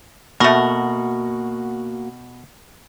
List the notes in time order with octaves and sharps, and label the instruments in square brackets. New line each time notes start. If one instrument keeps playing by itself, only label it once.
[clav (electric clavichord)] B2 [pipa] A3 A#4 [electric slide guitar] A#3 F#4